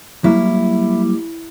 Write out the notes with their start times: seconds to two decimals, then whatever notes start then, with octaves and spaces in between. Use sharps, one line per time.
0.24 F#3 G3 A#3 E4